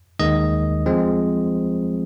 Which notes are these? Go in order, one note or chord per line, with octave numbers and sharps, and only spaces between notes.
D#2 D#3 G#3 D#5
F3 G#3 C4